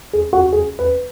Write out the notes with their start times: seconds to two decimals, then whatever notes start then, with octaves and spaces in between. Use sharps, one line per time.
0.13 G#4
0.33 F#4
0.52 G#4
0.79 B4